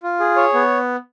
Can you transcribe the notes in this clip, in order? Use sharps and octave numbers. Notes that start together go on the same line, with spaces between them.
F4
G#4
C#5
B3